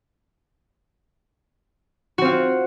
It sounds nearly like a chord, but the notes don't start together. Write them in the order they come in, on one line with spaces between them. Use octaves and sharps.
F#4 C4 F4